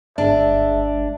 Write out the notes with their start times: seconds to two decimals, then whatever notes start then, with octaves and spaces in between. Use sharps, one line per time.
0.18 G1 G#3 D4 E5